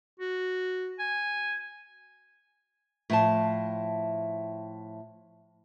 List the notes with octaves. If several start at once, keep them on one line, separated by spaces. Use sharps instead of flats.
F#4
G#5
A2 F3 A5